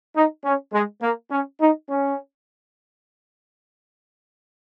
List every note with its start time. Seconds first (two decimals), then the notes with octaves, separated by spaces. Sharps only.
0.16 D#4
0.45 C#4
0.73 G#3
1.02 A#3
1.31 C#4
1.61 D#4
1.90 C#4